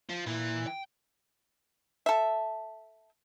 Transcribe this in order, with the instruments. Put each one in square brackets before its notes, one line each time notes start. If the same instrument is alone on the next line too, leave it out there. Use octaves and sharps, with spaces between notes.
[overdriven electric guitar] F3
[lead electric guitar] A#2 [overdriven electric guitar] E3
[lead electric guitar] G5
[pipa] A4 E5